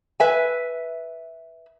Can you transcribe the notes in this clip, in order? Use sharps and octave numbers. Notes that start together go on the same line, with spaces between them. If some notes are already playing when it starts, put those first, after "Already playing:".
B4 E5 G#5